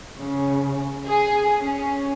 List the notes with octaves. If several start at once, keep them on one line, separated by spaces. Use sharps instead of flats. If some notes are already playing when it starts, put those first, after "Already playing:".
C#3
G#4
C#4